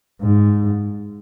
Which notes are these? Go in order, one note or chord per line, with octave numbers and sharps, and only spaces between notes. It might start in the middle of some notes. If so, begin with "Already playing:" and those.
G#2